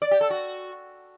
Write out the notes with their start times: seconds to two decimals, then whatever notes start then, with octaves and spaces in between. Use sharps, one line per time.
0.02 D5
0.11 G4
0.21 A4
0.30 F#4